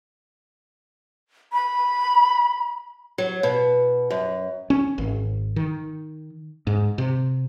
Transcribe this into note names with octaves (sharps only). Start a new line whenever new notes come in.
B5
F#3
B2
F#2
C#4
G#1
D#3
G#2
C3